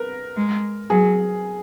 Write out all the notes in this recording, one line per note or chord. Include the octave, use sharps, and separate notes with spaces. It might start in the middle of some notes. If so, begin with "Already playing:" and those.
Already playing: A#4 B4
G#3
F#3 G#4